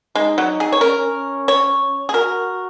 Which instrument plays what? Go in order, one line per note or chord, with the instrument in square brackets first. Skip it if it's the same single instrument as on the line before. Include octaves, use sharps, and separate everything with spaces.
[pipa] G#3 [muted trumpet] D#4
[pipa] F#3
G#4
C#5
[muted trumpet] C#4 [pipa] A#4
[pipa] C#5
G#4
[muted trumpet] F#4 [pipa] A#4